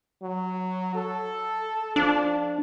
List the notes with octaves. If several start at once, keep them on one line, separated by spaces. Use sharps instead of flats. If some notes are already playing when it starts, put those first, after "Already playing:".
F#3
A4
F3 D4